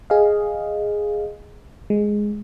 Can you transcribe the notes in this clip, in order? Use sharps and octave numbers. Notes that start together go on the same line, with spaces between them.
G#4 D#5 F5
G#3